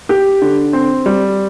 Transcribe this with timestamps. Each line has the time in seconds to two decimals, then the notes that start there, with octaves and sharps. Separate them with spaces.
0.09 G4
0.42 D3
0.73 C4
1.06 G3